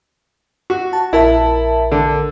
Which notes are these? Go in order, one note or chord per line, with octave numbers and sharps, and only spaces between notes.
F#4
A5
A#1 E4 A#4 A5
D3